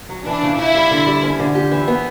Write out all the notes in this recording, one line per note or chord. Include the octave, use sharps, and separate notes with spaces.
F#3
E3 D4
C#3
C#3 E4
G3
D3
G3
C#4
D3
G4
E3
B3